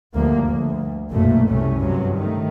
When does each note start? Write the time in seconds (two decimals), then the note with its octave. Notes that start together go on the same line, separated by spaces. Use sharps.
0.14 D2 G2 F3 A#3
0.47 D2
1.11 F#1 B1 F#2 A#2 A3 A#3
1.50 C2 C3 A3 C#4
1.79 G2 C3 F#3
2.16 D#3 A3